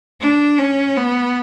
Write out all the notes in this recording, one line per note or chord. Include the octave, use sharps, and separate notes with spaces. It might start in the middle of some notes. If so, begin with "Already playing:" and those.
D4
C#4
B3